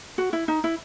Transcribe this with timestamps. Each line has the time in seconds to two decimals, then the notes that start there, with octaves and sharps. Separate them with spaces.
0.18 F#4
0.33 E4
0.48 D#4
0.64 E4